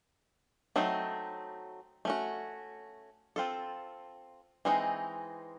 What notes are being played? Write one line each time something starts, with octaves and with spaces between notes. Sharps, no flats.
F#3 A3 C4 D#4
A3 C#4 F#4
C4 F4 A4
E3 G#3 C4 D#4